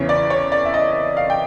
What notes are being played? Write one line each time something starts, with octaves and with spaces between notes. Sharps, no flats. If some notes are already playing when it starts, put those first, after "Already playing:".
Already playing: E2 C#3 E3 C#5
D5
C#5
D5
E5
D#5
F5
G5